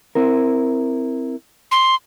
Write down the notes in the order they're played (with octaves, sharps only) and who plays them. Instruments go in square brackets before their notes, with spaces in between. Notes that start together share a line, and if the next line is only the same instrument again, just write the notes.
[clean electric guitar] C4 E4 A#4
[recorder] C6